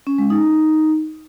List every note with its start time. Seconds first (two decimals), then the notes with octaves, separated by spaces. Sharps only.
0.07 C#4
0.18 G#3
0.30 D#4